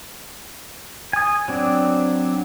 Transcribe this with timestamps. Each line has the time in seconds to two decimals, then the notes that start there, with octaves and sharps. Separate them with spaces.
1.13 G#5 D#6
1.48 F#3 C4 D4